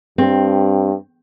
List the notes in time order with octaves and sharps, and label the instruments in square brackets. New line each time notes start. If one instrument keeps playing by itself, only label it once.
[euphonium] G2 [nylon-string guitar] C4